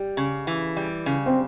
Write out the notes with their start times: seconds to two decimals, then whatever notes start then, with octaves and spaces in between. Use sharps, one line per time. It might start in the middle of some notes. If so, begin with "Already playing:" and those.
Already playing: G3 G4
0.17 C#3
0.47 E3
0.77 G3
1.06 C#3
1.26 C4